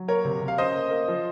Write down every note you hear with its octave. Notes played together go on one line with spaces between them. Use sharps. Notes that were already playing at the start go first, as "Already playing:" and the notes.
Already playing: F#3
A#3 A#4 C#5
C3
C3
F5
C#4 C5 D#5
A#3
A#3
F3